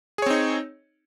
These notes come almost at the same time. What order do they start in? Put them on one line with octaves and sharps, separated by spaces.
G#4 C#5 C4 D#4